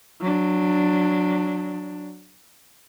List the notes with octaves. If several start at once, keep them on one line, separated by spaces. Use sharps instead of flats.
F#3 D4